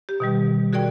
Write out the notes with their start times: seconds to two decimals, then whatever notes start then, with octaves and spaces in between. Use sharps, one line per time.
0.09 G4
0.20 B2 D#3 G3
0.73 F#4 G#4 A#4 D5 G5